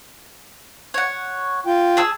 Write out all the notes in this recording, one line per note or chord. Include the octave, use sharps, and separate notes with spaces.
C#5 F#5
F4 G5
G#4 A5 E6